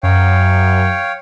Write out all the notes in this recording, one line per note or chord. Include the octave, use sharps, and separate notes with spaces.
F#2 C#5 F5 G5